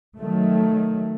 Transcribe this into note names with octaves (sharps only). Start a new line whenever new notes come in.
D#3 F#3 A3